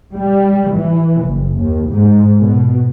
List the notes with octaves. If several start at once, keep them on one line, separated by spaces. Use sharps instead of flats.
G3
E3
F#1
D#2
G#2
B2